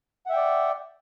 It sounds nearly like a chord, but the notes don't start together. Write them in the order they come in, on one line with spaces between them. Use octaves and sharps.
F#5 E5 G5 D5